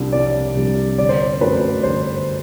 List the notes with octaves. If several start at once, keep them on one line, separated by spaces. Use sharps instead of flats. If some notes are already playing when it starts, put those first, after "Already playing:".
Already playing: C2 C3 G3 D4
C2 D5
C3 G3 D4
G1 D5
C5
D5
F#2 F#3 A3 C4 B4
G1 C5